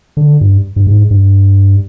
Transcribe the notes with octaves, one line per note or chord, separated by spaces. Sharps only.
D3
G2
G2
G#2
G2